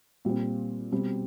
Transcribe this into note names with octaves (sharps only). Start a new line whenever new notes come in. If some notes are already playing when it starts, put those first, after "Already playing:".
A#2 G3 C4
B2 G3 C4